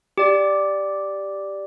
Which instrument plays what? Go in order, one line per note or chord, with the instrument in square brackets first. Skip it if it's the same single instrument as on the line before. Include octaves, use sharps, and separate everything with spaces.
[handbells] G4 D5